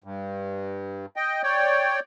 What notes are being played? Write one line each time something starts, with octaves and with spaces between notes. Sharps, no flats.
G2
D#5 G5
C#5 D5 G5